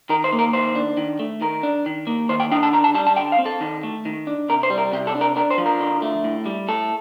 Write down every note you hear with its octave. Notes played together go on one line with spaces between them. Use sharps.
D#3 A#4
C5
A#3
A#4
D#3 C5
D4
D#3
A3
D#3 A#4
D4
D#3
A#3
D#3 C5
G5
D4 G5
A5
D3 A#5
A5
G3 A5
A5
D3 G5
F5
C4
A4
D#3
A3
D#3
D4
C3 A#4
C5
G3
A#4
C3 G4
A4
D4
A#4
D4 A#4
C5
F3
A#4
D3
A3
A2
G3
A2 A4